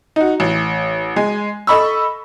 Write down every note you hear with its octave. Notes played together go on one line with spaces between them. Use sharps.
D#4 F#4
A1
G#3 G#5
A4 D#5 B5 C#6 E6